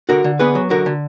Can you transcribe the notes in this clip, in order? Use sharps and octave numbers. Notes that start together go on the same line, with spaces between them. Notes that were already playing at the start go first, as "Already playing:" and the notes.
D3 F#4 A#4
D3
B3 G#4 B4
F#3
D3 F#4 A#4
D3